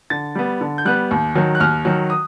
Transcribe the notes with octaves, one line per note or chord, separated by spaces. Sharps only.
D3 A6
G3 B3
D3
G6
G3 B3 F#6
D#2
D#3 F#3
F#6
D#2 F6
D#3 F#3
D#6